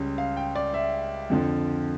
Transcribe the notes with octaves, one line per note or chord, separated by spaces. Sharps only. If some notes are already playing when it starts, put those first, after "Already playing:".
Already playing: C#2 C#3 G3 C#4
F5
G5
D5
E5
F2 D3 F3